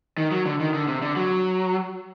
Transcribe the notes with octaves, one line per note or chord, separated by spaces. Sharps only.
D#3
F#3
D3
D#3
D3
C3
D3
F#3